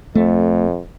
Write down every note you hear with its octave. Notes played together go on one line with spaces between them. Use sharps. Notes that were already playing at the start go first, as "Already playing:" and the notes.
F2 A3